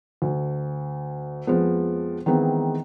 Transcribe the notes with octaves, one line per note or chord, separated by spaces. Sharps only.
D2
F2 F3 G#3 B3
D#3 E3 G#3 B3 C4 D#4